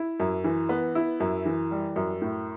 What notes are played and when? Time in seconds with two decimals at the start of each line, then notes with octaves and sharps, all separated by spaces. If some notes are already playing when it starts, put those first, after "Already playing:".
Already playing: E4
0.20 F#2
0.44 E3
0.69 B3
0.95 E4
1.20 F#2
1.46 E3
1.71 G3
1.96 F#2
2.22 A2